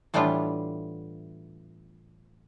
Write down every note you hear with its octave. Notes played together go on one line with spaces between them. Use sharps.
A2 E3 G3 B3 D4 F4